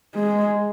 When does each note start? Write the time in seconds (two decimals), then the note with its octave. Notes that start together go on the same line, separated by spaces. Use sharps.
0.15 G#3